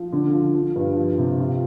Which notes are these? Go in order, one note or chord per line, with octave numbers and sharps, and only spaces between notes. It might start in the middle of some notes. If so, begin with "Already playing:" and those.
Already playing: F3
D3
F3
F3
G2
F3
C3
F4